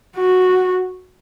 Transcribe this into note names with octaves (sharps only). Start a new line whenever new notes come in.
F#4